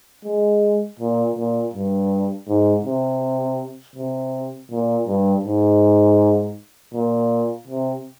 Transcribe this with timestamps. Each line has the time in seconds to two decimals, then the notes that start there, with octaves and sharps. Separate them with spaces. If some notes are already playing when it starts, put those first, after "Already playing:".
0.25 G#3
0.99 A#2
1.36 A#2
1.74 G2
2.48 G#2
2.85 C3
3.96 C3
4.71 A#2
5.07 G2
5.45 G#2
6.94 A#2
7.67 C3